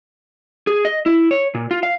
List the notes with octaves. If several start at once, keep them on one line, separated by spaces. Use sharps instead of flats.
G#4
D#5
E4
C#5
A#2
F4
F5